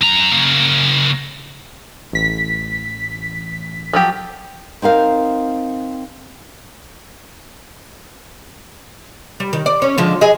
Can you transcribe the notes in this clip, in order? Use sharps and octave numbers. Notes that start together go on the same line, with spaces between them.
F#2 A#5
C#3 A#3
A1 B6
F3 F#3 G4
C4 D#4 A#4 F5
G3
D#3
D5
C#4
D3 F3 G#3
G#4 D#5